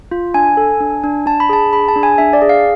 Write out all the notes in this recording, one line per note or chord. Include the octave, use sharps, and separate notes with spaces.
F4
D4 G#5
A4
D4
D4
D4 A5
B5
G#4 A5
G#4 B5
A5
D4
G#5
D4 E5
D5
G#4
F5